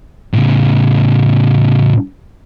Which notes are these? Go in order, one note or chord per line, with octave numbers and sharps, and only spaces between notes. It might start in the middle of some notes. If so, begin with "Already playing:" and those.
A2 C#3